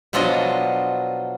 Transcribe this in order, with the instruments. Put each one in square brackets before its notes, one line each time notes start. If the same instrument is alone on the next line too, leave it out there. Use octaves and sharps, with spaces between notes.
[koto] B2 F3 F#3 D4 F4 D#5